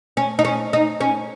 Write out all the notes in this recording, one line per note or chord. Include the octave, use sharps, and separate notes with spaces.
C#4
D#4
C#4
D#4
C#4